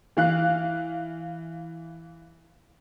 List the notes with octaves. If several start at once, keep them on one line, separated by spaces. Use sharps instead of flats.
E3 F5 F#6